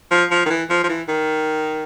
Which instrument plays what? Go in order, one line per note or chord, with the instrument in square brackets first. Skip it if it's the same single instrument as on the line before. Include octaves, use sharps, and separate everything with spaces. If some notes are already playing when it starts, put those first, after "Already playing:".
[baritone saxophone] F3
F3
D#3
E3
F3
F3
E3
D#3